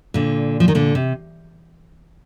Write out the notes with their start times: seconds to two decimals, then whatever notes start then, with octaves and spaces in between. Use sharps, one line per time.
0.14 A#2 D3
0.60 F3
0.68 D#3
0.75 A#2 D3
0.95 C3